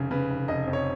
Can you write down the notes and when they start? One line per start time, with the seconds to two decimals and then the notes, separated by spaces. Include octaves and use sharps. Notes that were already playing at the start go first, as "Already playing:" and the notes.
Already playing: F1 C#3
0.11 C#3 B4
0.30 F1
0.48 F1 D#5
0.67 F2
0.73 C#5